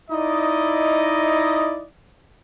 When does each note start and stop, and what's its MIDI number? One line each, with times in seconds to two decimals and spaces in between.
0.10 1.84 63
0.10 1.84 64
0.10 1.84 74
0.10 1.84 75